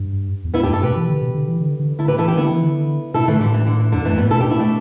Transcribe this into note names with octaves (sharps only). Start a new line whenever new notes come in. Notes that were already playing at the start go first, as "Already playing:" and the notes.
Already playing: G2
E2
B3 E4
G2 D4 G4
E4 A4
B2 G4 B4
E3
D3
B2
D3
E3
D3
D3
D3 E4 A4
G4 B4
E3 E4 A4
D4 G4
D3 B3 E4
E3
D3
B2 E4 A4
D3 E3 A3
A2 D3 G3
E3
D3
E3
E2 D3 G3
G2 E3 A3
A2 G3 B3
B2 E4 A4
D4 G4
B3 E4
A3 D4